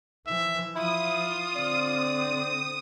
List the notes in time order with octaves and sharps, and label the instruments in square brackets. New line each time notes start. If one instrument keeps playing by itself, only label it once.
[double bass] E3 F3 [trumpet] E5
[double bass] F3 [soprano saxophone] E4 [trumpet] F4 [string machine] D#6
[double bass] D3 C4 [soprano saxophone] D5